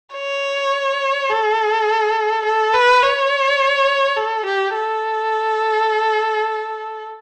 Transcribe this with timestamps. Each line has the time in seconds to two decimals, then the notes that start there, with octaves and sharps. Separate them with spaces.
0.14 C#5
1.29 A4
2.45 A4
2.73 B4
3.02 C#5
4.17 A4
4.45 G4
4.75 A4